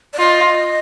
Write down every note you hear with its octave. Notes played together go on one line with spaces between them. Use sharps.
D5
F4 D#5